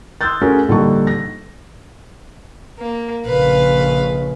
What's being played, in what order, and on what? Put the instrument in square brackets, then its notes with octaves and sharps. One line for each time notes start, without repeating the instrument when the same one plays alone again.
[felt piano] C6 D#6 E6 F#6 G6 A6
A3 C#4 F#4 G#4 A#4
A#1 D3 G3 D#4 A5 C#6
A#6
[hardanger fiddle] A#3
[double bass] A#1 C#3 [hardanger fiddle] B4 F5